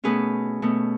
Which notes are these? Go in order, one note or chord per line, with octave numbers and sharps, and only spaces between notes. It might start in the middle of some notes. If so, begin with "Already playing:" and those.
B2 A3 C#4 G#4 B4
B2 A3 C#4